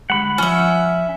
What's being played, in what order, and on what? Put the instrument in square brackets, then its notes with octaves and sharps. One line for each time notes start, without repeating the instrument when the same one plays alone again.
[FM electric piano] D3 G3 G#3 [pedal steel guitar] F#5 B5
[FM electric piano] F3 F4 [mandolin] C#4 E5